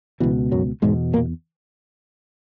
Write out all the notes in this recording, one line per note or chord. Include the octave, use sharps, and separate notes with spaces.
C#2 B2 E3
F#2 F#3
E2 G#2 B2 G#3
A#2 A#3